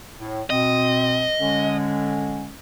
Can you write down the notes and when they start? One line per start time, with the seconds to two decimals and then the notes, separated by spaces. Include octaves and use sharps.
0.21 A2
0.50 B2 C4 D#5
1.40 D3 G#3 C#4